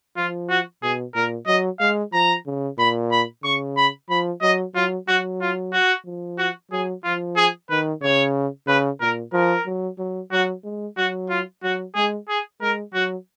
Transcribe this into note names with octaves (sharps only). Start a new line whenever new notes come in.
F3 F4
F#4
B2 G#4
A#2 A#4
F#3 D#5
G#3 F5
F3 A#5
C#3
A#2 B5
B5
C#3 C#6
B5
F3 B5
F#3 D#5
F#3 F4
F#3 F#4
F4
F#4
F3
F#4
F#3 G#4
F3 F4
G#4
D#3 B4
C#3 C#5
C#3 B4
A#2 A#4
F3 A#4
F#3
F#3
F#3 F#4
G#3
F#3 F#4
F4
F#3 F#4
G#3 G#4
G#4
G#3 A#4
F#3 F#4